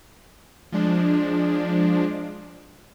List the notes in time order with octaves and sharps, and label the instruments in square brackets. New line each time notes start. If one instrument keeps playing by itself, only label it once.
[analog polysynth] F3 G#3 D4